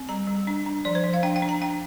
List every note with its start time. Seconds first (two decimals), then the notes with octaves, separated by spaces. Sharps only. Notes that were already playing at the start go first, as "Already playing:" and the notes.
Already playing: C4
0.09 G3 A#5
0.27 G3
0.47 D4
0.66 D4
0.85 F3 D5
0.95 C5
1.04 F3
1.14 F5
1.23 D4 G5
1.36 G5
1.42 D4
1.49 A#5
1.62 D4 G5